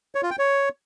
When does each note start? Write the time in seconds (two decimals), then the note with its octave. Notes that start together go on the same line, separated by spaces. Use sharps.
0.15 C#5
0.23 F4
0.31 G5
0.39 C#5